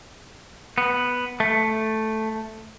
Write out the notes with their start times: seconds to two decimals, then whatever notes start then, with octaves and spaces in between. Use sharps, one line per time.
0.78 B3
1.40 A3